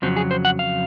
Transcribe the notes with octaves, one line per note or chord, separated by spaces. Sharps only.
F2 C#3 F#3 C4
G#4
C5
F#5
F5